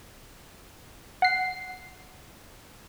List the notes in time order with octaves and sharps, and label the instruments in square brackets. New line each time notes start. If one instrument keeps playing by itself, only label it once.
[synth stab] F#5 C7